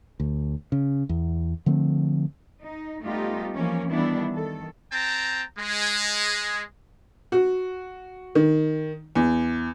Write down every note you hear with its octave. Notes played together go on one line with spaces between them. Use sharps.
D2
C#3
E2
D3 F3 A3 C4
D#4
G3 A3 B3 D#4 F4 G4
E3 F3 A#3 C#4
D#3 E3 G3 B3 D4 E4
D#3 A4
C4 G5 A5 A#5
G#3
F#4
D#3
E2